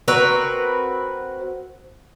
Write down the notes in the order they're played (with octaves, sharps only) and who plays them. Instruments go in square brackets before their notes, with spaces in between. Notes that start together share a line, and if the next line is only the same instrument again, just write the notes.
[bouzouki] C4 F#4 A#4 B4